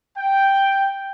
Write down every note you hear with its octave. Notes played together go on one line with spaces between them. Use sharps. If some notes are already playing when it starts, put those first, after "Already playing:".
G5